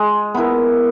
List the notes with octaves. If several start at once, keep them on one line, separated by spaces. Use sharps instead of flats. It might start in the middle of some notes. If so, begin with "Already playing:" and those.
Already playing: G#3
B3 E4 A#4